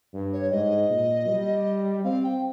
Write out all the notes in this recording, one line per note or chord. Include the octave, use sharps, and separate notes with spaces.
G2
C#5
G#2 D#5
A#2
G3
C4 F5
G5